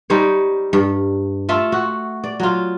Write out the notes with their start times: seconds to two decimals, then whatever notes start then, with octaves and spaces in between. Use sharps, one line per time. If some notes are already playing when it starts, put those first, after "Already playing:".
0.10 G3 D#4 C5 C#5
0.73 G2
1.49 A3 F4 E5
1.72 F#4
2.24 D5
2.40 F#3 F4